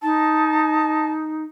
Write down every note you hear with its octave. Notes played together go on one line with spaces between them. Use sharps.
D#4 A5